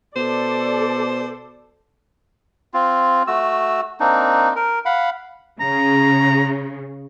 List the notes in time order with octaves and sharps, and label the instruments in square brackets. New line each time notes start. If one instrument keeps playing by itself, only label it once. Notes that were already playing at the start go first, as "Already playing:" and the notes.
[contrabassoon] B2 [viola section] A4 D5 [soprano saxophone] C5
[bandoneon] C4 F4
A3 F#4 E6
A#3 C4 D4 D#4
A#4
F5 F#5 B5
[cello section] C#3 [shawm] A#5